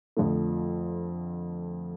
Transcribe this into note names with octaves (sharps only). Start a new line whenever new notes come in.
F2 D3 F3 A3